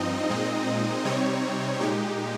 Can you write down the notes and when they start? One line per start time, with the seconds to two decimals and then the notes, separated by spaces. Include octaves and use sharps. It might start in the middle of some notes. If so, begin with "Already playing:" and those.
Already playing: G2 F3 C4 D#4 D#5
0.29 A#2 G#3 C4 D#4
1.05 C3 G3 C4 D#4 C#5
1.80 A#2 G#3 D#4 G4